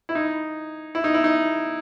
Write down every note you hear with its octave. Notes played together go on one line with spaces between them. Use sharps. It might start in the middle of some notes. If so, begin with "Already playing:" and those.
E4
D#4
E4
D#4
E4
D#4